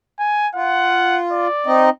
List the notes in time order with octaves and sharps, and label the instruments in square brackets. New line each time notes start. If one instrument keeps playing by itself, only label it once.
[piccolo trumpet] G#5
[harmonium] F4 [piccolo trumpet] F#5
[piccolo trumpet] D5
[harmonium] C4 D#4 D#5